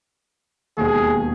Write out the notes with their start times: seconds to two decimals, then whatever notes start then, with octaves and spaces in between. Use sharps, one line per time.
0.77 E1 D#2 G#4